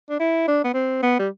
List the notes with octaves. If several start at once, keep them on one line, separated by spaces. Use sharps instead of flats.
D4
E4
D4
B3
C4
B3
G3